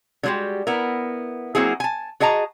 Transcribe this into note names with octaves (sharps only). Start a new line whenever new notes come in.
D3 G3 G#3 F#4 G4
B3 E4 A#4
F#3 A#3 C4 E4 F#4 G#4
G#5 A5
F#4 G#4 D#5 A5 A#5